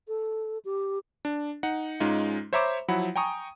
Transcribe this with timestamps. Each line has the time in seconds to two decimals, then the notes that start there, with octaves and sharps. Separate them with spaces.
0.08 A4
0.65 G4
1.25 D4
1.63 D#4 F#5
2.00 G#2 G#3 C#4 D#4 F4
2.53 C5 C#5 E5 A#5 B5 D6
2.88 F3 F#3 E4 F#5 B5
3.16 G5 G#5 A#5 C#6 D#6